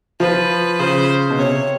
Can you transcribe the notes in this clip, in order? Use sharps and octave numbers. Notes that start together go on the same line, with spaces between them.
F3 B4
C#3 C5
B2
C3 C#5